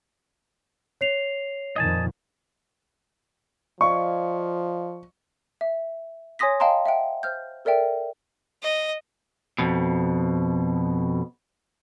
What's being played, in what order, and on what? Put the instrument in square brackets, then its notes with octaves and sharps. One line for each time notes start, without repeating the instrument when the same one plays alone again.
[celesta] C#5 C7 F7
[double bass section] F2 A#2 D#3 [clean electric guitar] D#5 G#5 A5
[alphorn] F3 [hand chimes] D5 D#5 F5 [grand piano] C#6
[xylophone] E5
C#5 G#5 C6 D#6 A#6 B6
D#5 F5 G5 A5 A#5 C6
E5 F#5 G5
C5 F6 G6
A4 A#4 D5 E5 G5
[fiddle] D#5
[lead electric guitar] F2 B2